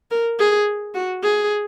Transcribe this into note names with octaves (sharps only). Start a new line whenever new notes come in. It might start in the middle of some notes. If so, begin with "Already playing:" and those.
A#4
G#4
F#4
G#4